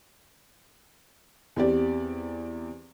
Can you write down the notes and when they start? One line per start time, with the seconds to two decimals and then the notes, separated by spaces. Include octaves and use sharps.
1.56 E2 C4 G4 D5